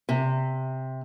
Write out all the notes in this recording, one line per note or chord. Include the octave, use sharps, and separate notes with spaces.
C3